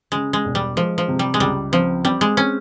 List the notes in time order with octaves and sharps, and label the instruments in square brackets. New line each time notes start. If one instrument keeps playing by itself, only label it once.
[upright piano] C#3 [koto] G#3
[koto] G#3
[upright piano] E1
[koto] G3
[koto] F3 [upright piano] G#3
[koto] F3
[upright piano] C3
[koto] G3
G#3
[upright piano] C#2 [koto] G3
[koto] F3 [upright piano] C4
[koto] G3 [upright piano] C4
[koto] G#3
[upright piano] C4 [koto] C#4